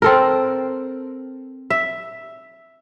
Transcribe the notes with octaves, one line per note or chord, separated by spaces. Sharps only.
C4 A4 A#4
E5